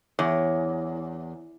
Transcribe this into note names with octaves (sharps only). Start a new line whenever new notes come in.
E2 C#5